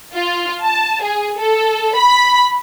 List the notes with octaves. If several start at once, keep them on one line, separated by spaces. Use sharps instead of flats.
F4
A5
G#4
A4
B5